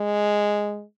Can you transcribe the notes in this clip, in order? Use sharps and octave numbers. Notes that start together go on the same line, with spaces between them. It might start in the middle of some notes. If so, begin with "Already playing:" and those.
Already playing: G#3